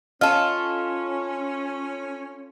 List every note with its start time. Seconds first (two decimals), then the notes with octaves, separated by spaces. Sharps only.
0.21 C#4 F4 A4 D#5 A5 F6